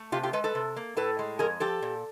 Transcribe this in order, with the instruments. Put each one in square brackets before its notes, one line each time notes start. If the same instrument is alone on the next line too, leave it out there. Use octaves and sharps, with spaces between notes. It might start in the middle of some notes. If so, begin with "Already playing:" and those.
Already playing: [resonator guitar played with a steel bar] A3
C3 F4 G4
F4 G4
G#3 A4 B4
A4 B4
C3
A#3
A2 A4 B4
G#3
F2 G#4 A#4
F3 G4 A4
A#2